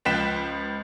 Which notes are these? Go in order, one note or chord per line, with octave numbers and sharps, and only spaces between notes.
C#2 F3 G5 F#6 B6 E7